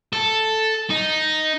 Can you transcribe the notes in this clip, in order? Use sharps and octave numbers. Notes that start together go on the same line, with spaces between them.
A4
D#4